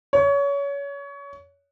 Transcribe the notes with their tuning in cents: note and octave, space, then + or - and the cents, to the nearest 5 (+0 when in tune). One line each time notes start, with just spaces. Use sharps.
C#5 +25